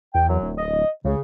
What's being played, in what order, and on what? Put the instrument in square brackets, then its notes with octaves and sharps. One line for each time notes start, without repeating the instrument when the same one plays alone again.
[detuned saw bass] E2 [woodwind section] G5
[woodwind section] F#2 F#3
[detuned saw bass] D1
[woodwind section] D#5
[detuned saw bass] C#2 [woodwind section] C#3